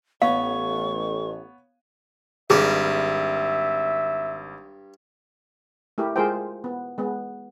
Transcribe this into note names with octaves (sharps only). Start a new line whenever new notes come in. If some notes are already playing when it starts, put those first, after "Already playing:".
A1 B3 C#5 F5 C#6
G#1 G2 G3 G#4 A#4 E5 D6
A3 E4 G4 A#4
G#3 F4 G#4 A#4 C5 G5
B3
G#3 B3